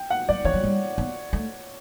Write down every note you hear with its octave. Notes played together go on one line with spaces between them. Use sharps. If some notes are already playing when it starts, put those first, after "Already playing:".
Already playing: G5
F#5
F#3 D5
E3 C#5
F#3
G3
B3
A3